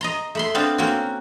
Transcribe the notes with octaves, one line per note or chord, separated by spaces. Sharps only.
D#5 A#5 C6
A3 B5 C6
B3 C4 D4 F5
A#3 C4 C#4 F#4